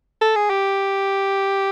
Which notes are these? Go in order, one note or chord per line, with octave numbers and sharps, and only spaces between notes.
A4
G#4
G4